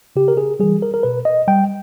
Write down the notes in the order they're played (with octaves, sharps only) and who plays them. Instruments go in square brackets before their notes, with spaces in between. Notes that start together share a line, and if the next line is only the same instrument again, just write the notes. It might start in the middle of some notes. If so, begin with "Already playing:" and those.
[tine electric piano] C#3 G4
A#4
G#4
E3 G3 G#4
A#4
A#4
B2 B4
D#5
G3 G5